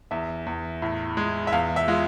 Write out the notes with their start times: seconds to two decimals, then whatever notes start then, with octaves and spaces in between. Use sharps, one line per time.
0.11 E2 E5
0.46 E2
0.82 A2
1.17 G#3
1.47 E5
1.52 E2 F5
1.76 E5
1.88 G#3 F4